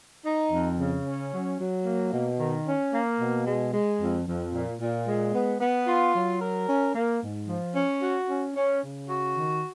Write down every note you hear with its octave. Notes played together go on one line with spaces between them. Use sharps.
D#4
F2
C#3
C#4
F#3
F#3
A#3
B2
D#3
C#4
A#3
B2
G#3
G#3
F2
F2
A#2
A#2
G#3
B3
B3
F4
F#3
A#4
C#4
A#3
G#2
F3
C#4
F#4
C#4
C#4
C#3
F#4
D#3